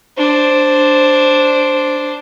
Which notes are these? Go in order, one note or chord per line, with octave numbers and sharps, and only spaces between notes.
D4 C5